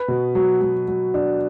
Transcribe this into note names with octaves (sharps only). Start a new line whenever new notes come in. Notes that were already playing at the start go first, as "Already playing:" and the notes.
Already playing: B4
B2
F#3
F#3
F#3
D4